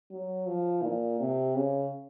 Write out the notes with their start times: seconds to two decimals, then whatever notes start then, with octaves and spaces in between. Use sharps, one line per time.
0.11 F#3
0.47 F3
0.82 A#2
1.20 C3
1.56 C#3